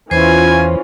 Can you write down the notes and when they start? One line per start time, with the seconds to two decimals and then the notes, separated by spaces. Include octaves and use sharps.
0.11 E2 E3 C#4 F4 C5 G#5